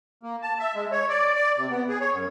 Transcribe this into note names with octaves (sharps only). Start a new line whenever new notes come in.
A#3
A5
E5
G#3
C#5
D5
D5
C3
B3
G#4
C#5
F#2